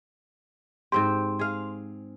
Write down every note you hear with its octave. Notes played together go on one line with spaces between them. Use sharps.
G#2 C4 G4 C6
G#4 F5